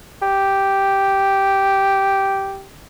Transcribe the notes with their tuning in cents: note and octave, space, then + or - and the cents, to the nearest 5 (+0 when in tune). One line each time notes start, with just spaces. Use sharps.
G4 -5